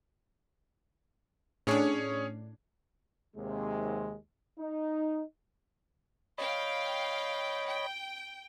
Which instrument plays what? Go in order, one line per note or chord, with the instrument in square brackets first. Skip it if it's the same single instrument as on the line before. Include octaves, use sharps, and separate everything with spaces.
[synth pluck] A2 D4 [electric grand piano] C#4 G#4 C#5
[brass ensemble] D#2 C3 G#3
D#4
[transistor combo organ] C#5 D#5 B5 [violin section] F5 G5
[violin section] G5